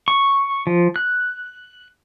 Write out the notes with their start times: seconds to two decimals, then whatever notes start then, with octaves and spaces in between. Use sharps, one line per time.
0.08 C#6
0.67 F3
0.96 F#6